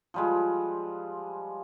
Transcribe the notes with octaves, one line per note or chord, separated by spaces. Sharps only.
F3 G3 G#3